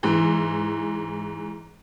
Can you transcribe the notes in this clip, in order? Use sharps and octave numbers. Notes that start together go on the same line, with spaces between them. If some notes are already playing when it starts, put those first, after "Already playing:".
G#2 E3